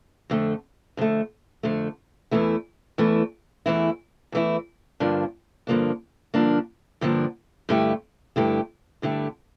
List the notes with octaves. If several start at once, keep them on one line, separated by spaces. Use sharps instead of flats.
F2 D3 A3
F2 D3 A3
F2 D3 A3
E2 E3 A3 E4
E2 E3 A3 E4
E2 E3 A3 E4
E2 E3 A3 E4
G2 D3 F3 A#3 D4
G2 D3 F3 A#3 D4
G2 D3 F3 A#3 D4
G2 D3 F3 A#3 D4
G2 D3 A3 E4 G4
G2 D3 A3 E4 G4
G2 D3 A3 E4 G4